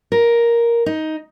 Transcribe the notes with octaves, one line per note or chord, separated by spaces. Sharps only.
A#4
D#4